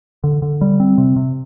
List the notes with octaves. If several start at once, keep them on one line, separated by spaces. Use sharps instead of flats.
D3
D3
G3
C4
C3
C3